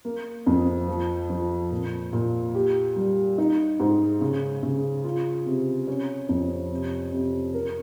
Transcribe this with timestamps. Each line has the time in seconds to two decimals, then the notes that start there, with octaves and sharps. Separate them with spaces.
0.05 A#3
0.46 F2
0.88 F3
1.30 F3
1.71 A#2
2.13 A#2
2.55 G4
2.96 G3
3.38 D#4
3.80 G#2
4.21 C#3
4.63 C#3
5.04 F4
5.46 C3
5.87 C#4
6.29 F2
6.71 C3
7.12 C3
7.54 A#4